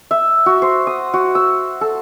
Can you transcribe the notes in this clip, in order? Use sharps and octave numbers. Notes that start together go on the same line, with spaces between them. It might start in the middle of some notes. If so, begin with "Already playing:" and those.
E5
F#4
C5
D#6
F#4
E6
A4